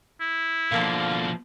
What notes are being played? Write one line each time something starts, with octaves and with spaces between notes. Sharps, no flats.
E4
B2 D3 F3 A#3